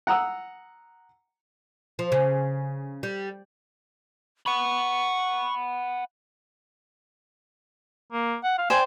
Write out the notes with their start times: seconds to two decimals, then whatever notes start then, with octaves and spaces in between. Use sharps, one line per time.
0.07 F#5 A#5 D#6 E6
1.99 F3
2.12 C#3
3.03 G3
4.46 F#5 B5 C#6
8.12 A#3
8.44 F#5
8.58 F5
8.70 C5 D5 G5 G#5